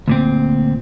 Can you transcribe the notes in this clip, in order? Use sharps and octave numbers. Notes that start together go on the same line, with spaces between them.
D2 A#2 C4